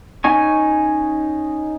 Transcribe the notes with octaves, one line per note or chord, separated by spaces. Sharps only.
C#4 D#4 G#5 C#6